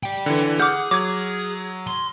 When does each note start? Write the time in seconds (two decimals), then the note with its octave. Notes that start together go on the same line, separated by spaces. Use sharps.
0.03 D5 G5
0.26 D3 E3
0.60 G#4 F#5 D6 F6 G6
0.91 F#3 D6 G#6
1.87 C6